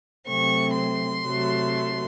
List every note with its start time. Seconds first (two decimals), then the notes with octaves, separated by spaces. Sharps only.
0.28 C3 F#3 A3 C4 C#6
0.77 C6
1.25 C3 F#3 A3